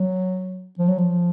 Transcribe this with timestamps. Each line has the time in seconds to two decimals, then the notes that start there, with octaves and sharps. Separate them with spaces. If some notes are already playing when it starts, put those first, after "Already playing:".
Already playing: F#3
0.79 F3
0.88 F#3
0.98 F3